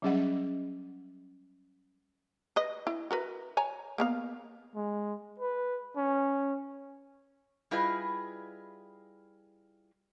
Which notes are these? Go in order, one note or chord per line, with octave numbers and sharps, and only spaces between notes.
F#3 G3 C#4 G#4 D#5 F#5
B4 D#5
E4
F#4 A#4 B4
C#5 G#5 A#5
A#3 B3 F5
G#3
B4
C#4
G3 E4 F4 G#4 B4 D#5